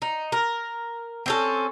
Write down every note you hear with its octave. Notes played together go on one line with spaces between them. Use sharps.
D#4
A#4
C4 C#4 A4